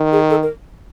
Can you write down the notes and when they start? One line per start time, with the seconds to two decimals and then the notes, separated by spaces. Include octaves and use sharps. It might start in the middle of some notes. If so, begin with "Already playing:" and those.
Already playing: D#3
0.12 G#4
0.30 A4
0.43 A#4